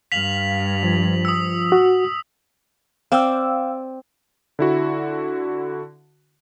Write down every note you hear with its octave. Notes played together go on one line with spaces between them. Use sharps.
G2 F5 B6 F7 F#7
F3
D#6 E6
F#4
C4 D5 F5 G5 E6
D3 E4 F#4